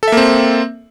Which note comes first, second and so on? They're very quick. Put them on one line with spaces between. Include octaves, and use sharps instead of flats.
A4 E5 A#3 C4